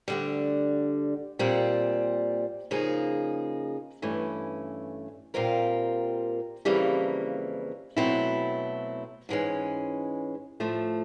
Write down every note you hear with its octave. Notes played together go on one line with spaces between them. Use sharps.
D2 D3 G3
A#2 G3 C4
C#3 F3 A#3 D#4 G#4
G2 E3 A3 C#4
A#2 G3 C4 F4 A#4
F2 C#3 E3 G3 A#3
B2 F#3 A3 C4 E4
G#2 E3 G#3 C#4
A2 F3 A3